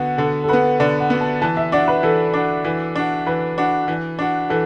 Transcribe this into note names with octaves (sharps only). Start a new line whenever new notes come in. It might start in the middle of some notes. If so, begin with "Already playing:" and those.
Already playing: D3 B3 F#4
D3 A4
A4
B3 F#4 B4
D3 D5
F#5
B3 F#4
A5
E3 A5
E5
D4 F#4 D5
B4
E3 A4
D4 F#4
E3
D4 F#4
E3 B4
D4 F#4
E3
D4 F#4
E3 A4